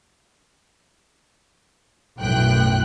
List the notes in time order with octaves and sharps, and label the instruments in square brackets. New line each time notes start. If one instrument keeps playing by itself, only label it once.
[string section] B1 F#2 A2 G5 F#6